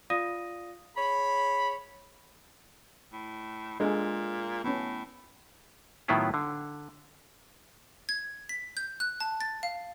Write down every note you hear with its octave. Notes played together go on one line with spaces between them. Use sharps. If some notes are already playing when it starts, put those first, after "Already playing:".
F4 D5 F5 D#6 A#6 D#7
G#4 C#5 B5
A2
A#2 G#3 D4 G#4 A4
A2 B3 C#4
A2 D#3 F#3 B3 E4 F4
D3
G#6
B6
G6
F#6
A5
A6
F5